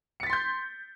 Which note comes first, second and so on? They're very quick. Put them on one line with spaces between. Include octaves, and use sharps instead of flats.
C#7 A6 B6 C6 G6